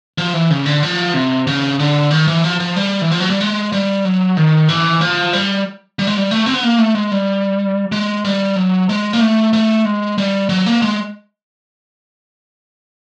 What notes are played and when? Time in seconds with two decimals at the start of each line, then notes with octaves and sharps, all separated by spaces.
0.18 F3
0.33 E3
0.50 C#3
0.66 D3
0.83 F3
1.14 C3
1.47 C#3
1.79 D3
2.11 D#3
2.28 E3
2.44 F3
2.60 F3
2.76 G3
3.01 E3
3.11 F3
3.20 F#3
3.30 G3
3.41 G#3
3.72 G3
4.05 F#3
4.37 D#3
4.69 E3
5.01 F3
5.33 G3
5.99 G3
6.07 G#3
6.17 G3
6.31 A3
6.46 C4
6.54 B3
6.63 A#3
6.78 A3
6.95 G#3
7.12 G3
7.92 G#3
8.25 G3
8.56 F#3
8.89 G#3
9.13 A#3
9.20 A3
9.53 A3
9.85 G#3
10.18 G3
10.49 F#3
10.66 A#3
10.82 G#3